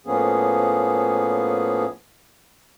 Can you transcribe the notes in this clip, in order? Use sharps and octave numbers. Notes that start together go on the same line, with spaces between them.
A2 F3 A#3 B3 C#4 G#4